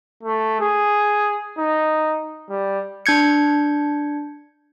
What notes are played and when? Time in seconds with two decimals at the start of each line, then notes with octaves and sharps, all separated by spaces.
0.23 A3
0.61 G#4
1.58 D#4
2.50 G3
3.06 D4 G6 G#6 C#7